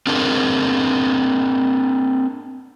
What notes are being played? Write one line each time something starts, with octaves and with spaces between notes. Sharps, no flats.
C4 D4 G#4 A#4